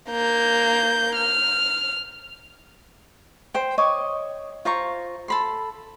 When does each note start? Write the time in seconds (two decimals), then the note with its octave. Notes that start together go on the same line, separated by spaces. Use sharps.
0.10 A#3 G6
1.16 F6
3.54 C5 G5
3.78 C#5 D#5 C#6 D6
4.65 F4 C5 A#5 C#6
5.28 A4 B5 C6